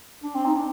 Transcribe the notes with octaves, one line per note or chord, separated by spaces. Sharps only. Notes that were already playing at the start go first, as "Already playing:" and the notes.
D4
C4
D#4
D4